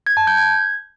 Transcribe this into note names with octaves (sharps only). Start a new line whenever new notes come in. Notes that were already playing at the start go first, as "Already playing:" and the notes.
G#6
A5
G6
G#6